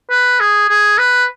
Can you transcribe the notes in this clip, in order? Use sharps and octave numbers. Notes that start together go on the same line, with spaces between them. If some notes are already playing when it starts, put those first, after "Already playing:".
B4
G#4
G#4
B4